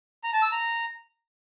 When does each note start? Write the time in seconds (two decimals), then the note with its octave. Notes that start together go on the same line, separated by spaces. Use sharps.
0.24 A#5
0.33 A5
0.43 E6
0.52 A#5